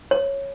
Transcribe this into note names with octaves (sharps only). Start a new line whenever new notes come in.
C#5